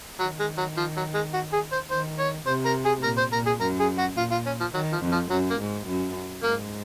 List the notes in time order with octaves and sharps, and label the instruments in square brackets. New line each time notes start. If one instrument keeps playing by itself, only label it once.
[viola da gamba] D#3 [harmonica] F#3
[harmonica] G#3
F#3
F3
F#3
G#3
F#4
G#4
C5
[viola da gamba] D#3 [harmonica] C5
[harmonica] C#5
[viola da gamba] C3 [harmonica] C5
[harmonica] A#4
G#4
[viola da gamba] A#2 [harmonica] A#4
[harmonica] C5
[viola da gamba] A#2 [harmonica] A#4
[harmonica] G#4
[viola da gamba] F#2 [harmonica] A#4
[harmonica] G#4
F#4
[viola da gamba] A#2 [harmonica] F4
[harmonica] F4
C#4
F3
[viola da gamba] D#3 [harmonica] F#3
[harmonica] F3
[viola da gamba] F2
[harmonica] F3
[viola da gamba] F#2 [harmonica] F#3
[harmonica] A#3
[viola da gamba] G#2
F#2
[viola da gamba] G#2 [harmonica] A#3